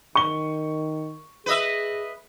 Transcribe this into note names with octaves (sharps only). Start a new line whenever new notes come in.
D#3 C#6 G7
G#4 B4 D#5 E5